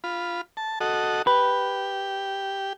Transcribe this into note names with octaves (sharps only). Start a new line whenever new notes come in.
F4 B5
A5
F#4 A4 D#5
G4 B4